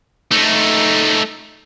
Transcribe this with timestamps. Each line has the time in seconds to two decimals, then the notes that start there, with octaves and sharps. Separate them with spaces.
0.31 A3 D#4